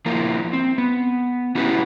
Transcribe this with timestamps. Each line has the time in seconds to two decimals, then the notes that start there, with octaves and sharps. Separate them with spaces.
0.06 F3 A#3 E4 A#4
0.53 C4
0.78 B3
1.55 C#4 E4 F#4 G4 B4